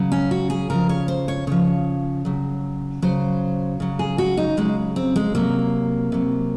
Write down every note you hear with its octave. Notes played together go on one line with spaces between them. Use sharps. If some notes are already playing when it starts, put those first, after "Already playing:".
Already playing: C#3 F#3
C#4
F#4
G#4
C#3 F3 A#4
C#5
C5
C#5
C#3 F3 C#5
C#3 F#3
C#3 F#3 C5
C#3 F#3
G#4
F#4
D#4
C#3 F#3 G#3
C4
G#3
C3 F#3 A#3
C3 F#3